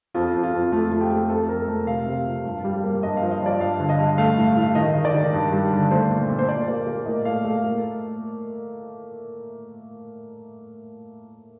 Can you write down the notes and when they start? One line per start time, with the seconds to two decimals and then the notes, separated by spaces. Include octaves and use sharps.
0.14 F2 F4
0.34 F2
0.43 F4
0.53 F2
0.72 A3 F4
0.92 A3
1.01 G4
1.11 A3
1.29 F2 A4
1.49 F2 A#4
1.68 A3
1.87 C3 F5
2.06 C3
2.26 F3
2.45 G2
2.64 G3
2.84 A#3
3.03 G2 D#5
3.17 F5
3.22 F3
3.31 D#5
3.41 F3 D5
3.60 G2 F5
3.80 D3
3.89 D#5
3.99 G2
4.18 A3 F5
4.37 A2
4.57 A2
4.75 D#3 D#5
4.95 D#3
5.05 D5
5.14 D#3
5.33 G2
5.52 G3
5.72 D3
5.91 A3 C5
6.10 A#2
6.30 A#2
6.39 C5
6.49 A#2 D5
6.68 A#3
6.87 A#3
7.06 A2 D#5
7.25 A3 F5
7.45 A3
7.64 A#3